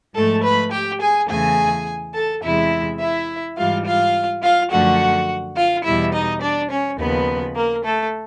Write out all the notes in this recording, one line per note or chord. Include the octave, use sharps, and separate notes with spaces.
G#2 F3 A3 A4 A5
B4 B5
G4 G5
G#4 G#5
E2 C#3 E3 A3 G#4 G#5
A4 A5
E2 C3 E3 G#3 E4 E5
E4 E5
G#2 E3 G3 F4 F5
F4 F5
F4 F5
F#2 D3 F3 A3 F#4 F#5
F4 F5
E2 B2 G3 E4 E5
D#4 D#5
D4 D5
C#4 C#5
D#2 C#3 F3 B3 B4
A#3 A#4
A3 A4